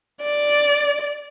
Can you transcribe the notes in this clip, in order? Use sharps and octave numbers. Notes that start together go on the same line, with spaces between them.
D5